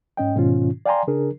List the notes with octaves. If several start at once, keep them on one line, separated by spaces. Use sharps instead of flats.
G#2 C#4 D#5 G5
G#2 B2 D#3 C#4 F4
D5 F5 G5 G#5 A#5 C6
C#3 D4 G#4 A#4